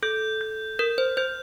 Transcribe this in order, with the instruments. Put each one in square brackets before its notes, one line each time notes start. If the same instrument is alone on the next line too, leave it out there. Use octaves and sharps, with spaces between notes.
[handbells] A4 [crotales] G6
[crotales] G6
[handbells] A#4 [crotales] G6
[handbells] C5
[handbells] C5 [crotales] G6